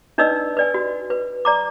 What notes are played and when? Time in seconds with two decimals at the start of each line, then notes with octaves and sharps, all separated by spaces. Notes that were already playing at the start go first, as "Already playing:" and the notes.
0.18 D4 D#4 B4 D5 D#5 E6
0.57 B4 D5 G#5
0.74 F#4
1.10 B4
1.45 D5 A#5 D6